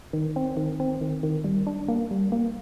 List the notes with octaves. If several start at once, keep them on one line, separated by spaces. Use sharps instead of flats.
D#3
C4
D#3
C4
D#3
D#3
G3
D4
A#3
G3
A#3